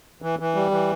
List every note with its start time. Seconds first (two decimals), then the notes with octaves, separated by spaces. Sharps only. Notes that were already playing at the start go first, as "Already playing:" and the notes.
0.22 E3
0.39 E3
0.55 G3
0.71 E3